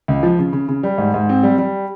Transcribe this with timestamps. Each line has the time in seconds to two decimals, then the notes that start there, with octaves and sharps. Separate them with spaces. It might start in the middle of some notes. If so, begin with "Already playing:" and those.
0.08 C#2
0.23 F3
0.39 C#3
0.53 C#3
0.69 C#3
0.83 G3
0.98 G#2
1.14 G#2
1.29 C4
1.43 G3
1.58 G3